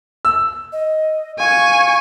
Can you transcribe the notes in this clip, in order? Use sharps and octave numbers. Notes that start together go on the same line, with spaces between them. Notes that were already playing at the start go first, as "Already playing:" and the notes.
E6
D#5
F5 G#5 C#6